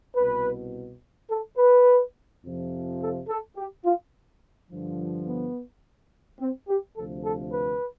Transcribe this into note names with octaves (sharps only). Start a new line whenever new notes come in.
C2 B2 B4
A4
B4
F2 C3 F3
A4
A4
G4
F4
G2 D3 F3
B3
C4
G4
D2 C3 F3 A4
A4
B4